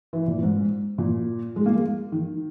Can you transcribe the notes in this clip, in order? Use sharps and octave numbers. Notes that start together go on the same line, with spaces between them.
E3
A#2
G#2
A#2
G#3
A#3
G#3
D#3